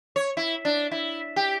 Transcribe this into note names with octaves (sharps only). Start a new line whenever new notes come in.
C#5
E4
D4
E4
G4